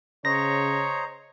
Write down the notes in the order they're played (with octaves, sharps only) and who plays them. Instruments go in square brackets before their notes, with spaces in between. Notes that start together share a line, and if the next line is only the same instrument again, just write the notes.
[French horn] C#3 [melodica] C5 D#5 A#5 [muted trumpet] C#5 [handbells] A#6